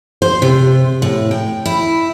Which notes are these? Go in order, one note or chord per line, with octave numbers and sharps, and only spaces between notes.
C5
C3
A2
G5
E4